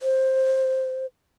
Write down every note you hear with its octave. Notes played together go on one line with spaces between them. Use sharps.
C5